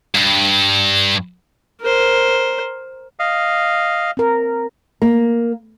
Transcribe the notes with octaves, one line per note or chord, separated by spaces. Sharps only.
G2
A#4 C5
D#5 F5
C4 A#4
A#3